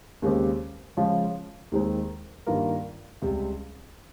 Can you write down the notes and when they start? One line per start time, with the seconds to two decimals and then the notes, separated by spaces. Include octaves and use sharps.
0.22 D#2 C#3 G#3 C4 G4
0.97 C#3 F3 G#3 C#4 F4
1.72 D#2 D#3 G#3 C4 D#4
2.47 G2 D#3 A#3 F4 A#4
3.22 C#2 C3 G3